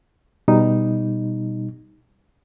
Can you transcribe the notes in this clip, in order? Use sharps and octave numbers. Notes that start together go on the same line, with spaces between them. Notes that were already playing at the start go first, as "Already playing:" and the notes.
B2 G3 D#4